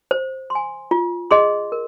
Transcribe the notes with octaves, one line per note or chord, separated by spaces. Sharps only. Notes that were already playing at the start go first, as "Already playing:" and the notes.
C5
C6
G#5
F4
G#4 D#5 C6
A#4